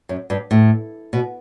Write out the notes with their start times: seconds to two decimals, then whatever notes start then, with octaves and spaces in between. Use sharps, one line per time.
0.09 F#2
0.30 G2
0.51 A2
1.13 B2